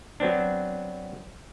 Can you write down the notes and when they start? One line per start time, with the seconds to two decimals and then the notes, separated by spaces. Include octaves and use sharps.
0.20 F#3 B3 C4 D4